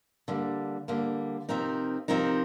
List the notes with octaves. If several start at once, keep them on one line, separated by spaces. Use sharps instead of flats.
D3 G3 A#3
D3 G3 A#3
C3 F3 C4 D#4 A#4
C3 F3 C4 D#4 A#4